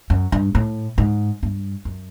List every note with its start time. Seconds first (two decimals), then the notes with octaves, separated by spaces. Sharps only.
0.10 F#2
0.32 G2
0.55 A2
0.98 G#2
1.43 G2
1.85 F#2